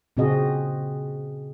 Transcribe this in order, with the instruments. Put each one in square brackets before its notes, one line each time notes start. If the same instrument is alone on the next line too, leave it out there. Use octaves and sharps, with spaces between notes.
[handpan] A#2 C#3 C4 F#4 G#4 D#5